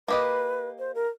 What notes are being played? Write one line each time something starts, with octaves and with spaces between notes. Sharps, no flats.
A#3 G4 B4 D#5
C5
A#4